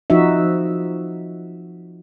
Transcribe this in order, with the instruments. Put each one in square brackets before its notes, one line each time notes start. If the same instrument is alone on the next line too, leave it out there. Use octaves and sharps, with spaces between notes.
[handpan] F3 D#4 F#4 E5